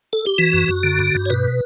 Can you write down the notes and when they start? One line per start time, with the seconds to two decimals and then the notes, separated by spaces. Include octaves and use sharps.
0.13 A4
0.26 G4
0.38 E3 F#4
0.53 F#2
0.68 F#2
0.83 D3
0.99 G2
1.15 G2
1.26 C#5
1.30 B2 B4